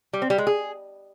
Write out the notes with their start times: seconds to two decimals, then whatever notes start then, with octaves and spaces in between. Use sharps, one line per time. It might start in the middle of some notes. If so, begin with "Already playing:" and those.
0.13 G3
0.22 C4
0.30 G3
0.38 G#3
0.47 G#4